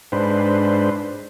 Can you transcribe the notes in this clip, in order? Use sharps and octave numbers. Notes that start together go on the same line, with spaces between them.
G#2 D4 B4 C5